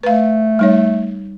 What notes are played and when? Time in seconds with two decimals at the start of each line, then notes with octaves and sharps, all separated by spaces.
0.03 A3 B4 F5
0.59 G3 D#4 C#5